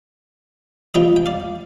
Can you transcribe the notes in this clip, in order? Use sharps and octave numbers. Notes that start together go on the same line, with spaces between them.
G3 C4 F4 D#5 G5
G5
D5 F5